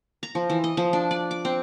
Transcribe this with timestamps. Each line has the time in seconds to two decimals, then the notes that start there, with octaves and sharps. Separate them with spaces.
0.23 A#5
0.35 F3
0.50 E3
0.64 D#5
0.77 F3
0.93 D4
1.11 D5
1.31 D6
1.45 C4